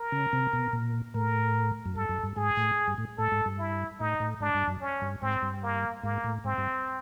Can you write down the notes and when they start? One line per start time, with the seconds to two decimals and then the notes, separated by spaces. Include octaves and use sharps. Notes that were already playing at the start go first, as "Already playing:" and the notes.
Already playing: A#4
0.12 C#3
0.33 C3
0.53 B2
0.73 A#2
1.15 A2 A#4
1.86 F#2
1.96 G2 A4
2.09 F#2
2.23 G2
2.36 G#2 G#4
2.57 A2
2.87 G2
2.98 A2
3.18 A2 A4
3.32 G#2
3.46 G2
3.59 E4
4.00 A2 D#4
4.20 A2
4.40 G#2 D4
4.54 G2
4.68 F#2
4.81 C#4
5.02 G2
5.22 G#2 C4
5.42 G2
5.63 A#3
6.04 G#2 A#3
6.24 A2
6.44 G#2 C4
6.58 G2